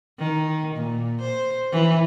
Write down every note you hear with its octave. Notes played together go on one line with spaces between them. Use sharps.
D#3
A#2
C5
E3